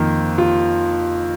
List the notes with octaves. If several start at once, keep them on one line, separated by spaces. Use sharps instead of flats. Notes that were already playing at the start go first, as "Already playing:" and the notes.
Already playing: F2 D#3 A#3 D#4 F4
F4